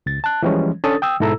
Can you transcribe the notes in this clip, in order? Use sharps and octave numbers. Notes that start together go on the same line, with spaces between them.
C#2 A6
A5 F#6
E3 F3 G3 G#3 C#4
C#4 D4 A4 D#6 A6
G5 D#6 E6
G#2 B2 E4 A4 A#5 E6